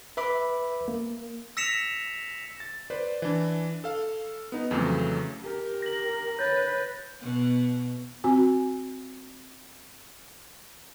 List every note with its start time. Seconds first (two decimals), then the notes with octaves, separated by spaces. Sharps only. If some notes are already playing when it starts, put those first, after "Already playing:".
0.17 B4 E5 B5 D6
0.88 A#3
1.57 E6 A#6 B6 C#7 E7 F7
2.60 A6
2.90 B4 C5 D5
3.22 E3 D4
3.84 A4 F5
4.52 B3 D#4
4.71 F2 C#3 E3 F#3 A3
5.44 G4 A#4
5.82 A#6 F#7
6.39 B4 C#5 G6 A6
7.21 B2
8.24 C4 F#4 G#5